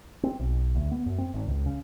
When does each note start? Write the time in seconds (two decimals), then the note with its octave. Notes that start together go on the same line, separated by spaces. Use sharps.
0.23 C4
0.39 B1
0.75 D2
0.91 B3
1.06 F#2
1.18 C4
1.34 G#1
1.47 C#2
1.66 C#3